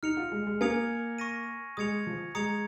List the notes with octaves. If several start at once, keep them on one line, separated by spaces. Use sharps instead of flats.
D#4 F6 C#7 F7
F4
G#3
G#3
A#3 G#5 D#6 G#6 C#7 F7
C#6 A#6 D#7
G#3 D#6 G#6 C#7 F7
F3
G#3 A#5 D#6 G#6 C#7 F7